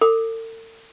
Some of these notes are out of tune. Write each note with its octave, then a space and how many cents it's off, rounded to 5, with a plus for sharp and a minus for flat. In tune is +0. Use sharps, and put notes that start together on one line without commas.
A4 +45 D6 +25